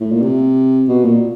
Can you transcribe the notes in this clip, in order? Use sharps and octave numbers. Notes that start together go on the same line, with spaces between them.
A2
A#2
C3
B2
A#2